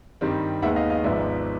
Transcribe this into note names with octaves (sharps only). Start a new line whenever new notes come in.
G2 D#3 G3 C4
D#2 D#3 G#3 B3 E5 F#5
D#5 F5
D#5 F5
G#1 G#2 F3 G#3 B3 D5 E5